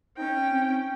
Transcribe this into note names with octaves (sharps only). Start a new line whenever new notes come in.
C#4 D#4 G5
C4